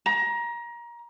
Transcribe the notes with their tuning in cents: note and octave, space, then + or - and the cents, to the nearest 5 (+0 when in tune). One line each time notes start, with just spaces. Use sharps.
A#5 +25